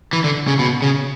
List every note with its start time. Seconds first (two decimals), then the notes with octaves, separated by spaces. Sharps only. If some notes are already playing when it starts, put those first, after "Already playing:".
0.13 E3
0.24 D3
0.48 C#3
0.59 B2
0.82 C#3